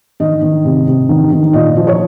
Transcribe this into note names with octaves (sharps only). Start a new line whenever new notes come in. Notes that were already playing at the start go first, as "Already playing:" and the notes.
D#3 D#5
D#3
C3
C3
D#3
D#3
A#2 D#5
F3
C#5